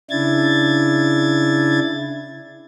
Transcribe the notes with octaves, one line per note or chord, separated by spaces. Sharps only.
C#3 D4 E4 G#6 A6